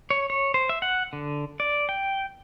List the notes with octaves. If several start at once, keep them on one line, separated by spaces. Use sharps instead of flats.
C#5
C#5
C5
E5
F#5
D3
D5
G5